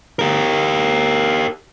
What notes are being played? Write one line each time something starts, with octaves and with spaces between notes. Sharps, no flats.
G4 A#4